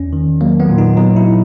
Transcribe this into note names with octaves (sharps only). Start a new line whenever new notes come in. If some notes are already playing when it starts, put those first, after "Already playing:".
Already playing: E2 C#4
D#3
F#3 A#3
B3
A#2
D#4
F#3 D#4
E4